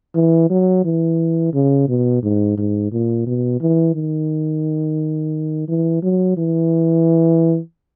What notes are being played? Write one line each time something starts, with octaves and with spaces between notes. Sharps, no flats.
E3
F#3
E3
C#3
B2
G#2
G#2
A#2
B2
E3
D#3
E3
F#3
E3